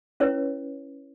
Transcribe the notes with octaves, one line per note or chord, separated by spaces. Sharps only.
C#4 E4 B4 C#5 E5